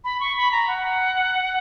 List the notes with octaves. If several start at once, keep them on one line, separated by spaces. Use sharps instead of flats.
B5
C#6
B5
A#5
F#5